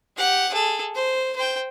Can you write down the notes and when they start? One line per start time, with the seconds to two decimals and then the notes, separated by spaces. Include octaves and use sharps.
0.17 G4 F#5
0.51 G#4 A4
0.95 C5
1.36 C5 G5